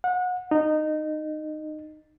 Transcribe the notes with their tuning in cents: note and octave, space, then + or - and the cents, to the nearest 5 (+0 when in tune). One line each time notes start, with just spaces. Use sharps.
F#5 -30
D#4 -15